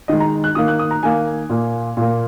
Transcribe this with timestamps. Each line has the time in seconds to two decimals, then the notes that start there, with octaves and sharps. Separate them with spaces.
0.08 D#3 G#3 D#5
0.20 A#5
0.44 F#6
0.55 D#3 A#3 D#6
0.68 F#6
0.79 D#6
0.91 A#5
1.03 D#3 A#3 G#5
1.50 A#2 A#3
1.97 A#2 A#3